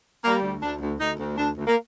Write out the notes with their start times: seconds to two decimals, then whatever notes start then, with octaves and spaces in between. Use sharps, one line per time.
0.24 G3 A#3
0.43 D2
0.62 D2 D4
0.82 D2
1.00 D2 D#4
1.19 D2
1.38 D2 D4
1.57 D2
1.67 A#3